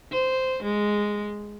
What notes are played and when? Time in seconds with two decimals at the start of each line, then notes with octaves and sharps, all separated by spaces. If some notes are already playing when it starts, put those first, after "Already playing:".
0.12 C5
0.63 G#3